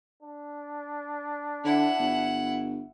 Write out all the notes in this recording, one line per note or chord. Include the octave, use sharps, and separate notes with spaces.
D4
D3 E4 F#5
G1